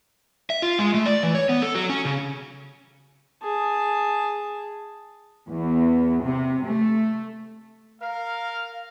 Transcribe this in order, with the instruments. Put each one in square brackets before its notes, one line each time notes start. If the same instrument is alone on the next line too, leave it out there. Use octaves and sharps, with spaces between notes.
[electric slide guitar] E5
F4
G#3
A3
D5
E3
C#5
B3
A4
F#3
C#4
C#3
[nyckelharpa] G#4 A5
[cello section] E2
C3
A3
[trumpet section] A#4 F5